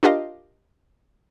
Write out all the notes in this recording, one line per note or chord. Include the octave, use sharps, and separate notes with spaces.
D4 F4 G4 A#4 D#5 F5